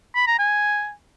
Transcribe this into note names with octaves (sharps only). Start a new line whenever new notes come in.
B5
A#5
G#5